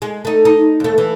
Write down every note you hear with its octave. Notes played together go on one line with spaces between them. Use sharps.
G#3
A3 D#4
D#4
D#2 A3
E3